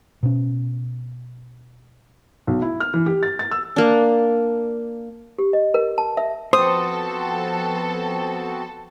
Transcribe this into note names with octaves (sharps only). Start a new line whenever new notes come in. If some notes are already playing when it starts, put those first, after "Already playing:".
B2 C#4
B1
E4
F6
E3
G4
A6
A6
E6
A#3 D4
G4
D#5
A#4
A5
E5
F3 B3 C4 F#4 A4 C5 D#6